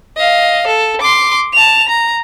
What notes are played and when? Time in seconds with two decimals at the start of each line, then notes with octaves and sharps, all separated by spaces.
0.17 D#5 F5
0.67 A4
1.02 C6 D6
1.53 A5 F7
1.88 A#5